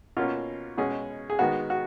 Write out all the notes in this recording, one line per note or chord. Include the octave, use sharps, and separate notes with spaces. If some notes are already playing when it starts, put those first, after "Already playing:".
B2 A#3 C#4 F4
B2 G#3 C#4 G#4
G#4
D#3 G#3 B3 F#4
F#4